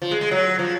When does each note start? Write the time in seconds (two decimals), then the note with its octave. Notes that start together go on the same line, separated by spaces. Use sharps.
0.02 F3
0.11 G#3
0.21 G#3
0.31 F#3
0.59 F3